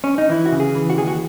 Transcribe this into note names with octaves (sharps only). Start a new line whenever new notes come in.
C#4
D#4
E3 E4
F#4
C#3
G#4
E3
F#4
D#2 G#4
F#4